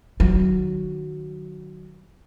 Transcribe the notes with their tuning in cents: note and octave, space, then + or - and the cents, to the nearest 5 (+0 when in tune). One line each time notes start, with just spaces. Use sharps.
D#3 -30 F#3 +0